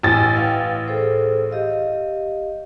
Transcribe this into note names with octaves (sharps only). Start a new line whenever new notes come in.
A1 G#5 A6
B4 F5 G5
G#4 A4 C5
G4 D#5 F5